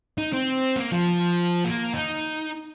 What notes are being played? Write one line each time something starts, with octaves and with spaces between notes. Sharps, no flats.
D#4
C4
A#3
F3
A#3
D#4